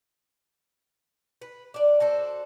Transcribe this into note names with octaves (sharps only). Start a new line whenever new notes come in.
B4
D4 D5
F#4 A4 C5